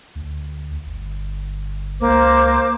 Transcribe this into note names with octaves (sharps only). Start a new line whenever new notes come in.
D2
G1
C#2 A#3 C5 D6